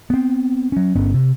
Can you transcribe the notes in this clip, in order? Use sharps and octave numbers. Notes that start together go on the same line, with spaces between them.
B3 C4
F#3 C#4
G1 B3 C#4
C3